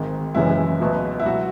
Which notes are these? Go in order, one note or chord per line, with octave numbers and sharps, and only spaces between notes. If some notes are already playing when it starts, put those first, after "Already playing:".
Already playing: G#1 G#2 D#3
F#1 F#2 C#3 E3 G#3 E4
C#2 B2 F#3
E4
F#3 F#4